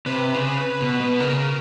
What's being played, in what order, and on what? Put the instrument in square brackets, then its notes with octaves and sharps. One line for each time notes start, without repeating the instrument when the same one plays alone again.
[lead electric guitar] C3 [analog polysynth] B4
[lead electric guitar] C#3
B2
B2
[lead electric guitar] C#3 [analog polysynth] A#4